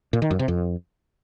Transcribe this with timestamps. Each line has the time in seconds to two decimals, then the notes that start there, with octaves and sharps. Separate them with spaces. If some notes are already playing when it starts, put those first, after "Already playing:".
0.13 A#2
0.22 D#3
0.31 F#2
0.39 C3
0.48 F2